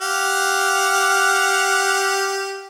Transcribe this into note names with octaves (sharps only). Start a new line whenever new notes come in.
G4 F5 F#5